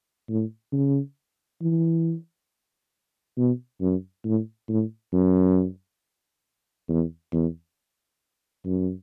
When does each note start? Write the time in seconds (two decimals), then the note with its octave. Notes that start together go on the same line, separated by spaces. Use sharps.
0.29 A2
0.73 C#3
1.62 E3
3.38 B2
3.81 F#2
4.25 A2
4.69 A2
5.13 F#2
6.89 E2
7.33 E2
8.65 F#2